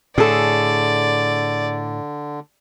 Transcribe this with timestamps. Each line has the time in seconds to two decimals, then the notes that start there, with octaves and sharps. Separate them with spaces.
0.18 A2 D3 G#4 A4 D5